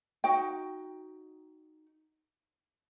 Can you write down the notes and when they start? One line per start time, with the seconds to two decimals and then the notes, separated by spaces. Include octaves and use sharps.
0.24 D#4 F#4 G5